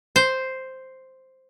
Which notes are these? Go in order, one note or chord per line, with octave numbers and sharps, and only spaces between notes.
C5